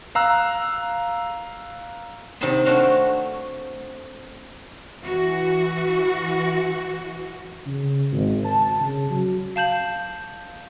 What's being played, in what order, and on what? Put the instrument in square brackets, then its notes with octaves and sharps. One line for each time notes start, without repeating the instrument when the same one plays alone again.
[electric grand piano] F5 A#5 E6 F#6
[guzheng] C3 D#3 D#4 A5 B5 C6
A3 C4 D4 F#4 F5
[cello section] E3 F#4
[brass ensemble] C#3
G#1
A5
C#3
F#3
[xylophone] F5 A5 G6 F#7